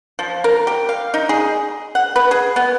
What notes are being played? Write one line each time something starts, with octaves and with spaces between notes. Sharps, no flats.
F3
A#4
G4
F5
D#4
G#4
F#5
B4
G#4
B3